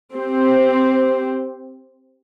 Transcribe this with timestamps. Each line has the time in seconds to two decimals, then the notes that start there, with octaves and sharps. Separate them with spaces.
0.14 C4 G4 C5